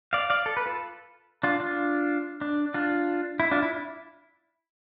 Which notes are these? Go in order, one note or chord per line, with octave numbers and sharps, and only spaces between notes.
D5 F5
D5 F5
A4
B4
F4 A4
D4 F4
D4 F4
D4
D4 F4
E4
D4 F4
E4